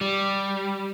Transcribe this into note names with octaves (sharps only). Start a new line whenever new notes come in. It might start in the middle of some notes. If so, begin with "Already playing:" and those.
G3